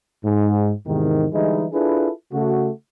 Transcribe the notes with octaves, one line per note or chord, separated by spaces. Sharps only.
G#2
E2 G#2 C3 D#3
D3 E3 G3 G#3 D#4 E4
D4 E4 F4 G#4 A4 B4
C#3 A3 F#4